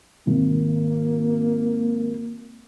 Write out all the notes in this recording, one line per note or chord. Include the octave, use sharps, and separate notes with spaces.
G#1 A#3